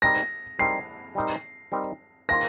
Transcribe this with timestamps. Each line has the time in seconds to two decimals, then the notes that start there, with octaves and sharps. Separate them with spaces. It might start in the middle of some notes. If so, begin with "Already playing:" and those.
0.02 G3 C4 D#4 A#4 A#6
0.59 G3 C4 D#4 A#4 C7
1.15 G3 C4 D#4 A#4
1.72 G3 C4 D#4 A#4
2.29 D#3 A#3 F4 C5 A#6